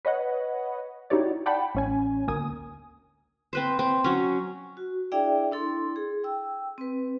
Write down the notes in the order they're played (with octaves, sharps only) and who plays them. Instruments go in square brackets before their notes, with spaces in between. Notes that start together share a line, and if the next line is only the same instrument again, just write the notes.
[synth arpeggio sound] B4 C#5 D#5 F#5
D#4 E4 F#4 G4 C#5 D5
D5 F#5 G5 A5 B5
A1 C#4 G#5
G#1 D2 A#3 G#5 D#6
[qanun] C4 B4 C5
C4
F#3 C#4
[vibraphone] F#4
D4 E4 G#4 D5 E5 G5
D4 E4 A4 C6
G#4
G5 E6
C4 B4